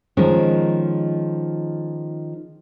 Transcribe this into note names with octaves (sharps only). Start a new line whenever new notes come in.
D#3 F3 G#3 C#4 A#4